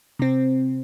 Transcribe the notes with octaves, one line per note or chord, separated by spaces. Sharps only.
C3 C4